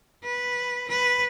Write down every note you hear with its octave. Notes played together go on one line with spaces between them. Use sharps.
B4
B4